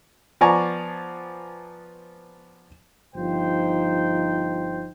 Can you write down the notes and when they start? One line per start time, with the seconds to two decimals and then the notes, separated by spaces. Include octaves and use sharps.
0.41 F3 B3 D5 G#5 A#5 C#6
3.15 G1 F3 D#4 C5 G5